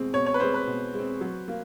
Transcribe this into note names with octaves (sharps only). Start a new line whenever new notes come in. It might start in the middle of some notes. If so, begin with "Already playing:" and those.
Already playing: B2 G#3 C4
B2 C#5
C#5
B4
G#3 C4 C5
B4
B2
G#3 C4
F#3
A#3